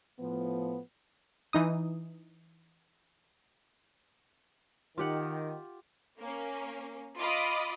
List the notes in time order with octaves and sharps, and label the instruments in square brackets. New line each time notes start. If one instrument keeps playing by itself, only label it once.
[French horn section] A2 F3 B3
[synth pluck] E3 D#4 D#6
[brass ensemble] D#3 [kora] F4 G4 F#5
[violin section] A#3 C#4
F4 D#5 B5 D6 D#6